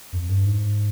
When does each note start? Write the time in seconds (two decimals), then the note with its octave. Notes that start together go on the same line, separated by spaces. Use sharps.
0.13 F2
0.29 G2
0.45 G#2